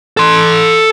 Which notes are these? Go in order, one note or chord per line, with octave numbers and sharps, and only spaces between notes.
A4 C6